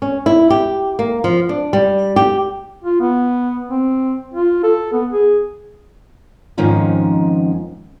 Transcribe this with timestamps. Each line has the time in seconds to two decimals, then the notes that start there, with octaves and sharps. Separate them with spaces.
0.02 C#4
0.26 E4
0.50 G4
0.99 A#3
1.24 F3
1.49 D4
1.73 G3
2.16 G4
2.84 F4
3.01 B3
3.69 C4
4.34 F4
4.64 A4
4.93 B3
5.12 G#4
6.57 F2 G#2 D#3 F3 C#4 D#4